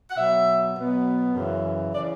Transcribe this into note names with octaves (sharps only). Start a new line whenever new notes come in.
F#5
B2 F#3 B3 E5
B2 F#3 B3
F#2 C#3 E3
C#3 E3 D5